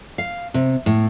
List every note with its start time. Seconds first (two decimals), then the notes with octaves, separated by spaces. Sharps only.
0.18 F5
0.54 C3
0.86 A2